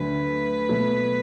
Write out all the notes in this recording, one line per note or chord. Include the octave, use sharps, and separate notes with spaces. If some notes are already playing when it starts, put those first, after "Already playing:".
Already playing: D2 D3 F#3 B4
B2 F#3 A3